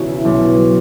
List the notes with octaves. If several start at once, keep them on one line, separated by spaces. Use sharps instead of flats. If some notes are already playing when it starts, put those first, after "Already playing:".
Already playing: E1 E2 C#3 C#4
E4
B1
B2
F#3